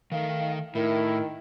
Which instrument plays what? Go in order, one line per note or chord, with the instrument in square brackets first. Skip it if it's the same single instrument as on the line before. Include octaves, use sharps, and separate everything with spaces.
[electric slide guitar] D#3 A#4 [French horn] A3 [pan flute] F5
[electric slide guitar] A2 [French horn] D#3 [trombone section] E4 [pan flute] A#4